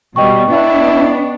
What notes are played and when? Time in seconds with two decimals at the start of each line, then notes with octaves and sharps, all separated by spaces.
0.16 B2 G3 D#5 G5 C#6
0.50 B3 D4 E4